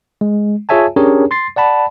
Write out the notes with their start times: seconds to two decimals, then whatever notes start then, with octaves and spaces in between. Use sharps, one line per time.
0.21 G#3
0.69 F4 G#4 C#5 E5 G#5 A5
0.96 C#4 D4 G4 G#4 A#4 C#5
1.31 C6 A6 C7
1.56 D5 F#5 A5 B5